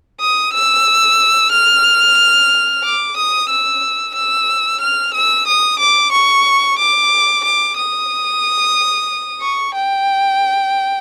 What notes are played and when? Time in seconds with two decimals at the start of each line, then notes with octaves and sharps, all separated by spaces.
0.21 D#6
0.53 E6
1.52 F6
2.84 D6
3.17 D#6
3.49 E6
4.15 E6
4.81 F6
5.14 E6
5.47 D#6
5.79 D6
6.12 C#6
6.79 D6
7.44 D6
7.77 D#6
9.41 C#6
9.75 G5